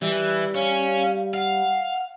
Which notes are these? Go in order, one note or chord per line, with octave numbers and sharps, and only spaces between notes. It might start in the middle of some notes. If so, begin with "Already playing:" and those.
E3 G3
C#4 F5
F5 F#5